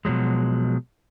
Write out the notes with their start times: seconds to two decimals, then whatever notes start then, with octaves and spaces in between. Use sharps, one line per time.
0.05 B2 F3 F#3 G#3